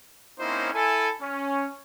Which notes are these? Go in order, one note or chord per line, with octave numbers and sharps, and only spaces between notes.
A#3 C4 C#4 D#4 E4 C5
E4 A4 G#5
C#4